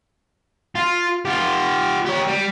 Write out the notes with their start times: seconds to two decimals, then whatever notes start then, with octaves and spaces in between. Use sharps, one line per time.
0.75 F4
1.25 F4 G4
2.06 G4 C#5
2.28 G3